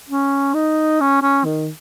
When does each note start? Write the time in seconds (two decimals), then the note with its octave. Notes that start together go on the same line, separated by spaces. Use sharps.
0.10 C#4
0.54 D#4
1.01 C#4
1.22 C#4
1.45 D#3